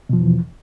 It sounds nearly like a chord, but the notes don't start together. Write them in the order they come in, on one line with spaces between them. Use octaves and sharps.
B2 F3 E2 E3